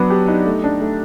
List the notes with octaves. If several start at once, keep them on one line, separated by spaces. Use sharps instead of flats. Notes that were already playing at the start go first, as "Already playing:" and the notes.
Already playing: F#3 B3 D4
G4
D#4
A3
D4
A3